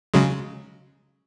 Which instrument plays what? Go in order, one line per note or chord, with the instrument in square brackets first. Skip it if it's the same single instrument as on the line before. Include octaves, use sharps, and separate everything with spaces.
[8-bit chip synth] C#3 F#3 G#3